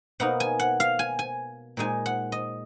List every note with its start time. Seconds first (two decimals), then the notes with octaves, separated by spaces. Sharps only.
0.20 B2 A#3 D#4 F#5
0.40 G#5
0.59 F#5
0.80 F5
0.99 G#5
1.19 G#5
1.77 A#2 G#3 D#4 G#5
2.06 F#5
2.32 D#5